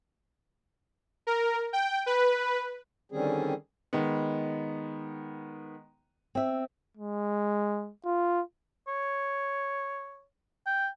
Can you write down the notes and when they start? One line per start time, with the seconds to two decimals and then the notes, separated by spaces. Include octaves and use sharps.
1.27 A#4
1.73 G5
2.06 B4
3.12 D3 D#3 G3 C4 C#4 G#4
3.93 D#3 G#3 B3
6.35 C4 E5
6.97 G#3
8.05 F4
8.88 C#5
10.66 G5